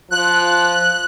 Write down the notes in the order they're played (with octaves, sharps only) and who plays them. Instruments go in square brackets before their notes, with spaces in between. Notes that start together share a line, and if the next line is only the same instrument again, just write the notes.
[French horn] F3 [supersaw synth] F#6